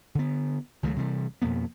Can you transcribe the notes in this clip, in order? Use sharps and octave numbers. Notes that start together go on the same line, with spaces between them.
D3 B3
C#2 D#3 F#3 A3
C3 E3 F3 G3
F2 B2 A#3 B3